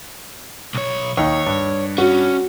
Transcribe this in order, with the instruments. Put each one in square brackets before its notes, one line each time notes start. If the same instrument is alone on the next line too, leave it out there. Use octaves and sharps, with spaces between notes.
[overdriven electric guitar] B1 C#5
[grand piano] D#2 D#4 [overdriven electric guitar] C#5
[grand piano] G2
[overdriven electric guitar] C#4 [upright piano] F#4